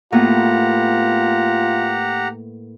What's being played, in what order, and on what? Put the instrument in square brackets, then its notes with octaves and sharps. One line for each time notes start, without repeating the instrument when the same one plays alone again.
[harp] A2 A#3 B3 [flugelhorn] F4 [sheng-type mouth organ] G4 F#5 A#5